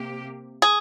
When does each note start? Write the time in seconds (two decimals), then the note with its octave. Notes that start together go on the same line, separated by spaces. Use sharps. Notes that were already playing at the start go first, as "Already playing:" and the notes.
Already playing: C3 A#3 G4
0.62 G#4